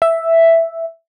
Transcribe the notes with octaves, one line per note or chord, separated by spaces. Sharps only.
E5